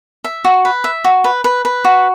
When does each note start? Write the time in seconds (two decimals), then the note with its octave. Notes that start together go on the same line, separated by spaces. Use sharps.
0.24 E5
0.45 F#4
0.65 B4
0.84 E5
1.04 F#4
1.24 B4
1.44 B4
1.65 B4
1.85 F#4